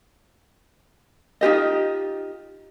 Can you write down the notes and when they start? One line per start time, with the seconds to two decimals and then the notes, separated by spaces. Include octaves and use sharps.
1.41 D#4 F4 G4 D#5